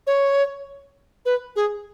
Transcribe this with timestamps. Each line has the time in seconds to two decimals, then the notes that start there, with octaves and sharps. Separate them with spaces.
0.07 C#5
1.26 B4
1.56 G#4